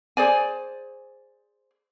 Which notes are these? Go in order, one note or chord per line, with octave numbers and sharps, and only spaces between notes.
G#4 C5 D5 G#5